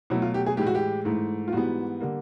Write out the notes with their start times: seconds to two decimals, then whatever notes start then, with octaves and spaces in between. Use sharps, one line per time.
0.10 B2 F#3 A3 E4
0.22 F4
0.34 G4
0.46 G#4
0.57 A2 E3 G#3 G4
0.67 F#4
0.75 G4
1.05 G#2 E3 A3
1.48 F4
1.52 G#2 E3 G3 B3 F#4
2.00 D3 G3 A#3